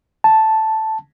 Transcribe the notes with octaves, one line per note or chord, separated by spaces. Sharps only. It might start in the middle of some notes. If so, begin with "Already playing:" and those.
A5